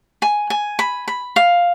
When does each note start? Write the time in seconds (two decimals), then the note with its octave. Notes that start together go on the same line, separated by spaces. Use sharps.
0.22 G#5
0.50 G#5
0.79 B5
1.08 B5
1.36 F5